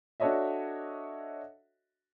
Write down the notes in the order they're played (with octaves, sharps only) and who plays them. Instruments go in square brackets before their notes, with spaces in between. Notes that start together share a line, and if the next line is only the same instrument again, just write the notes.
[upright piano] D4 F#4 A4 C#5 D#5 E5